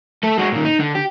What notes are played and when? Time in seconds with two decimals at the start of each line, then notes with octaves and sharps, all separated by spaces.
0.23 A3 A4
0.38 G#3 F#4
0.52 A#2 D#3
0.65 D#4
0.80 D3
0.95 G4